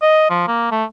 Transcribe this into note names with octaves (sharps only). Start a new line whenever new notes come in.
D#5
F3
A#3
A3